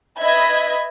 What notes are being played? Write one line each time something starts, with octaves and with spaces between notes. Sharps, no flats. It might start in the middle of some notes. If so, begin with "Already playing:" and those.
B4 D#5 E5 B5 G#6